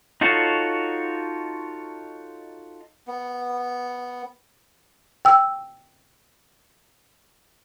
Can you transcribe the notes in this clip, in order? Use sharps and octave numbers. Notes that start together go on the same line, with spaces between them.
D#4 F4 F#4 A4 C#5
B3
G5 E6